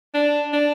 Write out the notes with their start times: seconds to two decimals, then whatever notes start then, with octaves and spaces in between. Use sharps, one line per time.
0.14 D4
0.53 D4